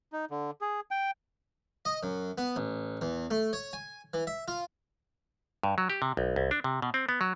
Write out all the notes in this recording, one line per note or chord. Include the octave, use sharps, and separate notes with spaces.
D#4
D3
G#4
G5
D#5
F#2
B3
A1
E2
A3
C#5
G#5
E3
E5
F4
G2
F#3
G4
C3
B1
C2
D4
C3
B2
C4
B3
F#3